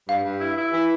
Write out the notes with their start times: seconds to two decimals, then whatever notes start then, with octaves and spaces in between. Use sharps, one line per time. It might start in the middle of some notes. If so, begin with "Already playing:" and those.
0.09 G2 F5
0.25 G2
0.41 E4
0.58 E4
0.73 E3